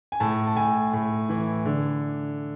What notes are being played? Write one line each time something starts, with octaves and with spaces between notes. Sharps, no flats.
G#5
A2 A5
A5
A2 G#5
A2
E3
D3